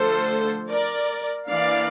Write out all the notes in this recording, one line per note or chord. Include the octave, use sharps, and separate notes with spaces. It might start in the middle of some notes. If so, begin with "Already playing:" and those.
Already playing: D3 F3 A3 A4 C5
A#4 D5
E3 A#3 D4 D5 F5